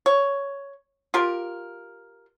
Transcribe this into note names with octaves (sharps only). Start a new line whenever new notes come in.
C#5
F4 G4 A#4